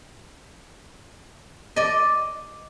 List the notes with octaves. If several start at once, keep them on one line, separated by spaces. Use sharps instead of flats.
D5 D#5